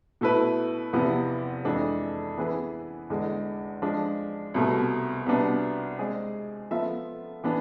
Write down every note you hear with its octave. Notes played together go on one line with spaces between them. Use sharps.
B2 A3 E4 B4
E2 C3 F3 B3 E4
F2 E3 G#3 D4 A4
E3 B3 E4 G#4 B4
E2 D3 G#3
F3 G#3 D4
C2 B2 A3
C2 B2 B3 D4
G#3 C4 G#4 D5
F3 B3 F4 A4 E5
E3 B3 D4